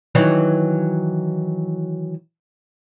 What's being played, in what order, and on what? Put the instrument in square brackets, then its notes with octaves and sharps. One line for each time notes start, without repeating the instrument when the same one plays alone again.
[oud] D#3 E3 F#3